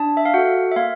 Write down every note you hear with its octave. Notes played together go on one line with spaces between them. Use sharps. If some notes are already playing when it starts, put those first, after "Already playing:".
Already playing: D4 A5
E5
F5
F#4 A4 F#5
E5
A#3 F5